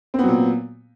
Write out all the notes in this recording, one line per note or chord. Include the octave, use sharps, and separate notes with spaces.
A#2 F#3 B3 C4